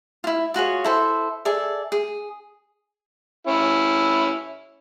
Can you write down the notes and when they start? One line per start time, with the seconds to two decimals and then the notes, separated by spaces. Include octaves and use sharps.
0.24 E4 F4
0.54 F4 F#4 G#4 C#5
0.84 E4 A4 C5
1.45 G#4 A4 D5 E5
1.92 G#4
3.47 C#4 E4